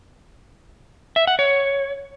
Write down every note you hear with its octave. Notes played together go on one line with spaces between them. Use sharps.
E5
F#5
C#5